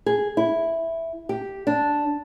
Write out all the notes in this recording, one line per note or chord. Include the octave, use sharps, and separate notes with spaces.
G#4
E4
G4
D4